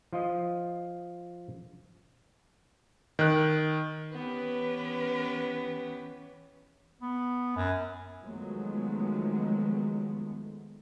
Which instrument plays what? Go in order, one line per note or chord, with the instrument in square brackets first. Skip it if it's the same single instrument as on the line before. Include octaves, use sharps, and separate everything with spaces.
[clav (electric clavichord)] F3 F4 D#5
[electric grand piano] D#3 F#6
[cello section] E3 C#4 [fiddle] B3 G4 [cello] B4
[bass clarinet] B3
F#2
[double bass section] D#3 F3 F#3 G#3 A3 B3